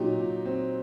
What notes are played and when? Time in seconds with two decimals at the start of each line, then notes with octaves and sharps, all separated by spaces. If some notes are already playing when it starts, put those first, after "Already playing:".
Already playing: A#2 F#3 D#4 G4
0.19 A#2
0.45 C4